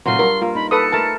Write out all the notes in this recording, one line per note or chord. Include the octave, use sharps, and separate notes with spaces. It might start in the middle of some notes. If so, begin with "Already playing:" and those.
A2 C3 D#3 F#3 F4 C6
G2 A#4
A#3 F4
D#4 B5
A4 B4 D#6 C#7
A3 A#4 B4 A5